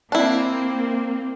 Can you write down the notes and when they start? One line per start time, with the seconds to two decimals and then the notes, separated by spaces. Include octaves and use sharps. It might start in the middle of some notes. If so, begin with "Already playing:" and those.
0.12 A#3 C4 D4 E4